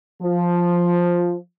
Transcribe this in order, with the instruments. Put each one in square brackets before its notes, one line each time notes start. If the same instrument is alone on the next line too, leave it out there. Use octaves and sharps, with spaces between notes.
[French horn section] F3